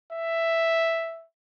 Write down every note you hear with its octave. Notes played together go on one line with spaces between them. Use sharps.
E5